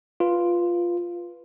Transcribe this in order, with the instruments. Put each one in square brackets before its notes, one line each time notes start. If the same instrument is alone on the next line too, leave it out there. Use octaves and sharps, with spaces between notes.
[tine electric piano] F4 B4